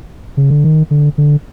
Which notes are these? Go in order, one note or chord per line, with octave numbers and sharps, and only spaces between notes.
C#3
D3
D#3
D3
D3